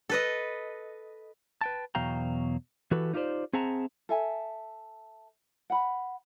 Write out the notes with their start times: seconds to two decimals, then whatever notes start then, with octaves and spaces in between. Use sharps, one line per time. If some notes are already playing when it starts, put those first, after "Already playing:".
0.09 A4 B4 D#5
1.61 B4 G5 A5
1.95 E2 B2 F#3 F5 G5 A#5
2.91 E3 F#4 G4 A4 B4
3.13 D#4 F4 G4 A4 C5 D5
3.53 C4 G#4 E5 F#5 A5 A#5
4.09 A4 E5 G#5
5.70 F#5 B5